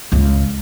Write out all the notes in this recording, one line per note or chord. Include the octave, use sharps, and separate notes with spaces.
C#2